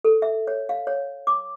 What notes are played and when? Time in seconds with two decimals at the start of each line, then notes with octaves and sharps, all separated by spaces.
0.05 A4
0.22 E5
0.47 C#5
0.69 F5
0.87 C#5
1.27 D6